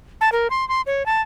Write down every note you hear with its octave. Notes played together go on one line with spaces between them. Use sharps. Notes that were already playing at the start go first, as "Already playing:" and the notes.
A5
A#4
C6
C6
C#5
A5